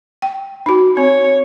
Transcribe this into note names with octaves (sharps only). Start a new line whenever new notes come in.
G5
D#4 F#4
C4 C#5